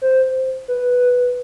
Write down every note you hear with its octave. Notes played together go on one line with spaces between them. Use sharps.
C5
B4